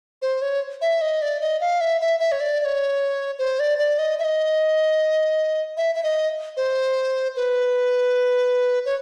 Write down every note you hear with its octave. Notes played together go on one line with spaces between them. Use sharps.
C5
C#5
E5
D#5
D5
D#5
F5
E5
E5
E5
C#5
D5
D5
C#5
C5
D5
D5
D#5
E5
D#5
E5
E5
D#5
C5
B4
C#5